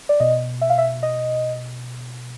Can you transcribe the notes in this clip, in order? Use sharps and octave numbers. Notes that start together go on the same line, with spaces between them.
D5
B2 D#5
E5
F5
E5
D#5